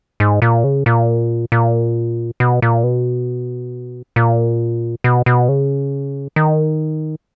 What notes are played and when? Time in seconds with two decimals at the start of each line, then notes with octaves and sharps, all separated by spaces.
0.20 G#2
0.42 A#2
0.64 C#3
0.86 A#2
1.52 A#2
2.40 B2
2.62 A#2
2.84 B2
4.16 A#2
5.04 B2
5.26 B2
5.49 C#3
6.36 D#3